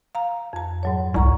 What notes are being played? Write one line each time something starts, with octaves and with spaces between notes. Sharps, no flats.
F5 A#5
F2 A5
G#2 F#3 C#5
C2 F#5 A#5 C#6